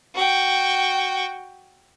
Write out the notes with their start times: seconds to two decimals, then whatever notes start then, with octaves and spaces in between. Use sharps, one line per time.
0.15 F#4 G5